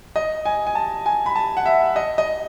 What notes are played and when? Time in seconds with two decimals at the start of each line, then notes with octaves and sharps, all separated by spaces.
0.16 D#5
0.46 G#5
0.67 G#5
0.75 A5
1.06 G#5
1.26 B5
1.36 A5
1.57 F#5
1.66 E5
1.96 D#5
2.18 D#5